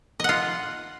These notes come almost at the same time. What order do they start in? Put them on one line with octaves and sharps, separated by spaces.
D#5 F#5 F4